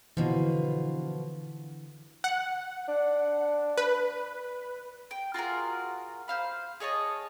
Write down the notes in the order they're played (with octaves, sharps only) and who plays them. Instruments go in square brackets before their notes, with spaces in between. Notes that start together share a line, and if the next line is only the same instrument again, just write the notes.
[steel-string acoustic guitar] B2 F3 [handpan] D3 E3
[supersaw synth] F#5
[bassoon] D4
[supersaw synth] B4
[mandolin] G5
F4 F#4 G#4 A#4
C5 F5 B5
G#4 C#5 D#5 A5